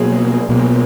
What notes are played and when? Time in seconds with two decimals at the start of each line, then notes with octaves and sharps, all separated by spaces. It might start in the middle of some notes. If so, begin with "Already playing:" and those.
Already playing: B2 F#3 A#3 G#4
0.49 B2 F#3 A#3